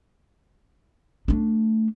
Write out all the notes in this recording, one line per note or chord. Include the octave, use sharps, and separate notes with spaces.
A3 D4